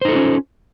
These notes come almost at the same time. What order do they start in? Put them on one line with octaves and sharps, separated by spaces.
C5 D#4 A4 F4 C#4